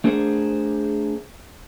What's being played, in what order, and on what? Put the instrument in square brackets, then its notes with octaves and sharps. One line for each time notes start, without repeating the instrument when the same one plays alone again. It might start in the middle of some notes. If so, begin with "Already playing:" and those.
[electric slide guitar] A3 D4 G#4 A#4 C5 F#5